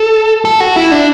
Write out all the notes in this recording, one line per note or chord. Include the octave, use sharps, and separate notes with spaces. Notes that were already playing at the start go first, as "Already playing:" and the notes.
Already playing: A4
A4
F#4
E4
D4